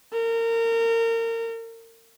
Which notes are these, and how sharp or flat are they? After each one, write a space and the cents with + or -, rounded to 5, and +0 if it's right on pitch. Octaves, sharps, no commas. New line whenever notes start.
A#4 -30